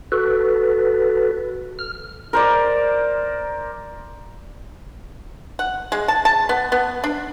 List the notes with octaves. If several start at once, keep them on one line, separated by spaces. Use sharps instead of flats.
F#4 A4 B4
F6
A#4 C5 D5
F#5
G#3
A5
A5
B3
B3
D4